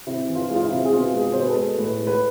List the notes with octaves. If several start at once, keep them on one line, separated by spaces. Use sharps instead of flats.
C3 E4
E3
F4
G#3
F4
E4
C3
G#4
B2 F4
G#3
G#4
B2 C5
B4
A4
G#3
A2 B4
G#3
B4